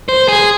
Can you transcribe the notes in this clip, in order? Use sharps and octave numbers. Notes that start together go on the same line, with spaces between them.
C5
G#4